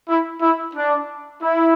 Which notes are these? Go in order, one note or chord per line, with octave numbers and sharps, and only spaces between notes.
E4
E4
D4
E4